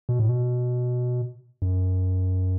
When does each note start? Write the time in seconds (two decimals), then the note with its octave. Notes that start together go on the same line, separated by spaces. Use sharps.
0.09 B2
0.20 A2
0.29 B2
1.62 F#2